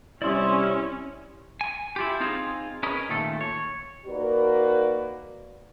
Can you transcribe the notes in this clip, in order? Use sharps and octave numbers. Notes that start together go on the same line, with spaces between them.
C3 G3 C4 C#4 E4 D5 C6 D#6
G#5
E4 F4 G4
C4 D#4 F4 G#4
C#4 G#4 A#4 B4 D#5
A#2 D#3 A3 A4
C#5
A#3 D#4 F#4 A#4 B4 D5